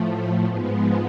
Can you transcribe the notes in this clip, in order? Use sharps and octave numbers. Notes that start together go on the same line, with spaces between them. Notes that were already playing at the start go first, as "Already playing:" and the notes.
Already playing: A2 F3 A3
G#2 F3 G#3 B3